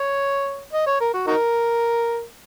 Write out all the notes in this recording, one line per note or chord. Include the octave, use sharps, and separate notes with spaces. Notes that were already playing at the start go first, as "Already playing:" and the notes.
Already playing: C#5
D#5
C#5
A#4
F#4
D#4 F#4 A#4